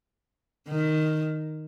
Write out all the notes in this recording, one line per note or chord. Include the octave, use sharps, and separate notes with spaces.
D#3